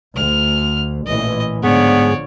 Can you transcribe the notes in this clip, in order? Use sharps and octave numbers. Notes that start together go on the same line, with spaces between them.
D2 F6
A1 A#2 E3 D#5
G#2 D3 F3 B3 G#4 C#5 D5